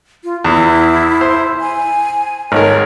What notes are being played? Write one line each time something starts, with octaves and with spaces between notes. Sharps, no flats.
F4
E2 E4
C5
G#5
G#1 A#4 C#5